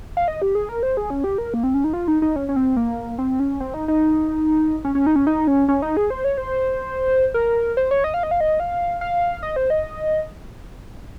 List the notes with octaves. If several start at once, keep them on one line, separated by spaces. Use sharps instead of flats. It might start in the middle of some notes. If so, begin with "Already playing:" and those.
F5
D#5
G4
G#4
A#4
C5
G#4
C#4
G4
A#4
A#3
C4
C#4
D#4
F4
D#4
D#4
C#4
C#4
C4
A#3
C4
C#4
C4
D#4
D#4
C#4
C#4
D#4
C#4
D#4
C#4
C#4
D#4
G#4
C5
C#5
C5
A#4
C5
C#5
D#5
F5
D#5
F5
D#5
F5
F5
D#5
C5
D#5